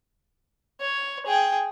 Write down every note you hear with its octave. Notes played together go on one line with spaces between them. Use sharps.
C#5
G#4 G5